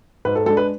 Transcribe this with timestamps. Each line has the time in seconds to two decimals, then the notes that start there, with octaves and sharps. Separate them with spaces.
0.25 G#2 B4
0.35 A4
0.46 G#3 A4
0.50 D4
0.57 B4